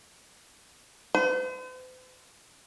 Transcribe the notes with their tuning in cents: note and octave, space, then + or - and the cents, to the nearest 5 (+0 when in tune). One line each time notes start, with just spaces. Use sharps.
C5 -45